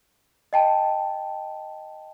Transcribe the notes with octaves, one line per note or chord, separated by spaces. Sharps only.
D#5 G5 A5